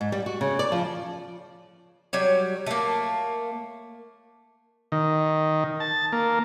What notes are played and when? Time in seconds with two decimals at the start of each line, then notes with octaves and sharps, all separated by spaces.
0.01 G#2
0.12 G3
0.26 F#4
0.41 C#3
0.59 D5
0.72 F3
2.13 F#3 G3 C#5
2.66 A3 A#3
4.92 D#3
5.80 A5
6.12 A#3